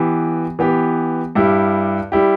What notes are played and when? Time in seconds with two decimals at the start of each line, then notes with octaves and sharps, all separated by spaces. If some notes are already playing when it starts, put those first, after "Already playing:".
Already playing: E3 B3 G4
0.59 E3 B3 G4
1.35 G2 G3 E4 G4
2.12 G3 E4 G4